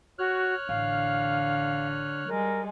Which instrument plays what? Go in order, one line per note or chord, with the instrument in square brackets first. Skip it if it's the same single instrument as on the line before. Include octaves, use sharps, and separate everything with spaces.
[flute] F#4 [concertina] C#5 F6 F#6
[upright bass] A1 [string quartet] D3 [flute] F5
[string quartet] G3 G#3 [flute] A#4